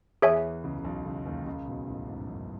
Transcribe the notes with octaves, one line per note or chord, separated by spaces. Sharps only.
E2 E3 G#4 C#5 E5 G#5
C#2 C#3
C#3
B1 B2
C#2 C#3
D#2 D#3
C#2 C#3
B1 B2
A1 A2
G#2
F#2